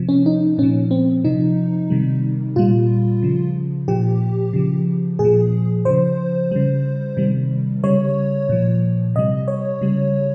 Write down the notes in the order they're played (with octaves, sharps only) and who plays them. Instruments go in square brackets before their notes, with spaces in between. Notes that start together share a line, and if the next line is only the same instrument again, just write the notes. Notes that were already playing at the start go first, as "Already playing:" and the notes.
Already playing: [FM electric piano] C3 F3
C#4
D#4
A#2 F3 C#4
C4
C3 F3 D#4
C3 D#3 G3
A#2 G3 F4
C#3 F3
A#2 F3 G4
C#3 F3
A#2 G#4
F3
C#3 F3 C5
C#3 G3
C3 D#3 G3
C#3 G3 C#5
A#2 F3
C3 G3 D#5
C#5
C#3 G3